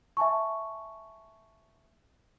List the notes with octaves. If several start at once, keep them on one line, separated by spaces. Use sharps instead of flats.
E5 G#5 A5 C#6